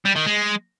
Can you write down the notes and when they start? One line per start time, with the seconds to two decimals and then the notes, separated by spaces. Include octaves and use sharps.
0.05 G3
0.16 D#3
0.26 G#3